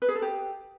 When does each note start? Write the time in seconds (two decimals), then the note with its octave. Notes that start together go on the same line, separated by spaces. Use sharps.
0.02 B4
0.09 G#4
0.15 A4
0.22 G4